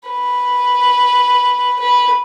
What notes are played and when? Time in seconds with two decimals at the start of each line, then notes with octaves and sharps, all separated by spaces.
0.09 B4
1.79 B4